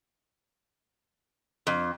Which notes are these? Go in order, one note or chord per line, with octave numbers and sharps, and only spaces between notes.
F2